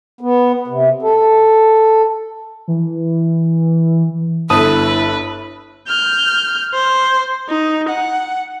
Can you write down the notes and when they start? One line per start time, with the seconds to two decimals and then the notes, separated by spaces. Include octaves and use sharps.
0.21 B3
0.68 C3
1.02 A4
2.68 E3
4.50 G1 E4 A4 B4 A5 D#6 D#7
5.88 F6 G6
6.74 C5
7.49 D#4
7.89 F#5